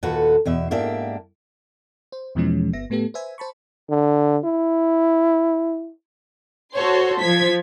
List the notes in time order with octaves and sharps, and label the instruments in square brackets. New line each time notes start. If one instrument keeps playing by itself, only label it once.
[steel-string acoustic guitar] D#2 A#2 F#4 A4 B4
E2 B2 E5
G#2 A#3 D4 G4 E5
[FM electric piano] C5
E2 B2 E3 F3 G#3 C#4
G1 B3 E5 A#6
A2 A3 B3 G4 A4
B4 C5 E5 G#5
C5 A5 B5 C#6
[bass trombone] D3
E4
[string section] F#4 A4 C5 C#5 C6
F3 G#6 B6